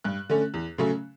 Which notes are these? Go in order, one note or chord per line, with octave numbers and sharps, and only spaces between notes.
G2 F#6
D3 A3 C#4
E2
C#3 F#3 A3 C#4